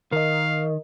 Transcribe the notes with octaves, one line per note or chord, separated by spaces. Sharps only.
D#3 A#4 D#5 F5